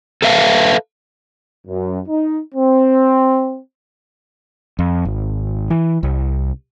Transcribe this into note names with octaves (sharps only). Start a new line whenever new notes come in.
A4 B4 E5 F5
F#2
D#4
C4
F2
G#1
E3
C2